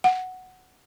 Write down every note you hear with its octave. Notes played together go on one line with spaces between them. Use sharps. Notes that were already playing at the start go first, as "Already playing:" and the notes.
F#5